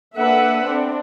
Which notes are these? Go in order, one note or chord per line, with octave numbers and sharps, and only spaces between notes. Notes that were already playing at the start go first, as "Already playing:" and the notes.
A#3 D4 A4 B4 E5 F#5
C4 D4